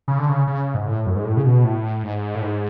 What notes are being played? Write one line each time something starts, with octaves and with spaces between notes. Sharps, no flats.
C#3
D3
C#3
C#3
G#2
A2
F#2
G#2
A2
C#3
B2
A2
G#2
A2
G#2